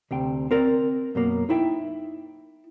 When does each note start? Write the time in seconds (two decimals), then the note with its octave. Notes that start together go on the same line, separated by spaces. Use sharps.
0.11 D2 C3 G5
0.51 C4 A#4 D5
1.15 F#2 B2 A#3
1.49 D#4 E4 E5 G5